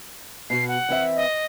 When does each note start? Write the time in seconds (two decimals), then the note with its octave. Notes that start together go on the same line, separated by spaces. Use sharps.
0.50 B2 F#4 C7
0.68 F#5
0.89 E3 C4 E5
1.16 D#5